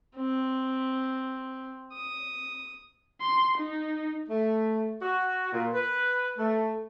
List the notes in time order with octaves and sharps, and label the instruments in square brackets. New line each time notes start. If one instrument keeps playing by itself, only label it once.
[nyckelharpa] C4
D#6
[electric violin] C6
D#4
[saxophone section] A3
F#4
A#2
B4
A3